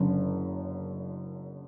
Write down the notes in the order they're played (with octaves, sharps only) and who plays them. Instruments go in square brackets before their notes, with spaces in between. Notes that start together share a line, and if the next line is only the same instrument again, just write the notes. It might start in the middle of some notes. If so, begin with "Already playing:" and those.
Already playing: [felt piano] F#1 F#2 D3